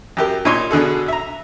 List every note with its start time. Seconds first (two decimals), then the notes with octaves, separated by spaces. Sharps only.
0.17 F#2 G4 A#4
0.45 A#2 D#4 C#5 C6
0.71 B2 D3 G#4 A4
1.08 E5 A#5